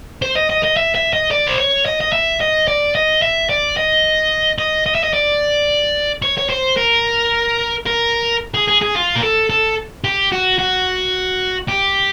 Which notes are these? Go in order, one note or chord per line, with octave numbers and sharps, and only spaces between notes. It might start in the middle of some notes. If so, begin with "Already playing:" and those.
C5
D#5
D#5
D#5
E5
E5
D#5
D5
C5
C#5
D#5
D#5
E5
D#5
D5
D#5
E5
D5
D#5
D#5
D#5
E5
D#5
D5
C#5
C#5
C5
A#4
A#4
G#4
G#4
G#4
F4
A#4
A4
A4
G4
F#4
F#4
G4